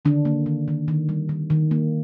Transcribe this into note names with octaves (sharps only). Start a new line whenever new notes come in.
D3 D#3 D4
A#3
D#3
D#3
D#3
G3
D#3
D#3
A#3